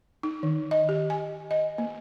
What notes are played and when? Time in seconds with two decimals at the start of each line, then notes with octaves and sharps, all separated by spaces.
0.23 D#4
0.43 D#3
0.71 D#5
0.89 G4
1.10 G#5
1.51 D#5
1.78 A#3